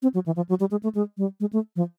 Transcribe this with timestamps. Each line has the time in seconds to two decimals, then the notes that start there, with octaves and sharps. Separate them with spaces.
0.02 C4
0.14 F#3
0.26 E3
0.36 F3
0.49 F#3
0.60 G3
0.71 G#3
0.83 A3
0.95 G#3
1.18 G3
1.40 G#3
1.53 A3
1.76 F3